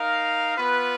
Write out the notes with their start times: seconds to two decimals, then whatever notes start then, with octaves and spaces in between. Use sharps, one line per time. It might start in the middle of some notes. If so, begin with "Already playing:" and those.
Already playing: D#4 A#4 F5
0.57 B3 F4 B4